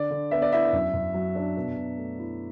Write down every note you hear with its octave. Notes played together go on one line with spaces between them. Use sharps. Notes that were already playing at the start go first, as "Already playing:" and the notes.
Already playing: D3 D5
D3
B3 E5
D5
E4 E5
F#2
F#2
F#3
D4
B2
B2
A3
E4